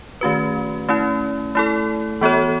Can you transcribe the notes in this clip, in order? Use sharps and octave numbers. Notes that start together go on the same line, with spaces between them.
D#3 A3 C#4 F#4 B4
A3 C#4 E4
A3 E4 A4
E3 B3 F#4 A4 C#5